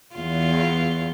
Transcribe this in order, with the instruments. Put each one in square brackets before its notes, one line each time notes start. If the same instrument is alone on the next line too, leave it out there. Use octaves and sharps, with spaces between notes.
[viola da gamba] E2 F4